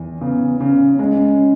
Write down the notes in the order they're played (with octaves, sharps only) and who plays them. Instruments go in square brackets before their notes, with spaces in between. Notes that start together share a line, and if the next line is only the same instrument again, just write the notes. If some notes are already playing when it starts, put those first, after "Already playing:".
Already playing: [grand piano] E2 E3
[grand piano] C#3 [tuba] B3
[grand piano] C#3 [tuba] C#4
[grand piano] G#3 [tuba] C#4